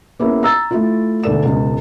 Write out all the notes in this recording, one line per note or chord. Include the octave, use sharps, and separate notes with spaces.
A#3 B3 C#4 E4 G#4
A#5 E6 A6
A3 E4 F4
E1 D2 G#2 A4 D5 E7
E1 C#2